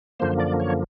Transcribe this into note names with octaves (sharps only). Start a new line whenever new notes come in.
F#2 D3 F3 A#3 C5
D5
C#5